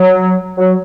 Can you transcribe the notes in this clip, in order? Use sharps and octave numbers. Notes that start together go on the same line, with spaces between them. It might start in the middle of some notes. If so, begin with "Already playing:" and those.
Already playing: F#3
F#3